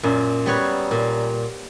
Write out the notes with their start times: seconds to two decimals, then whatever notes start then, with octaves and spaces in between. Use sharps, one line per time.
0.03 F#2 A#2
0.46 G3 B3 F#4 C#5
0.91 A#2